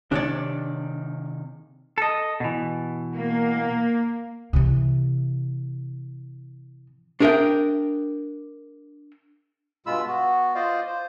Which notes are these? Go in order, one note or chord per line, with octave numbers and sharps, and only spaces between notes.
C3 D#3 D4 C#5 D5
A4 D#5
B2 E3
A#3
C3 E3
D4 G#4 A#4 D#5 E5 G5
G2 B2 G#3 F4 B5 E6
B3 F#4
F4 C5 D5 D#5 F5
C5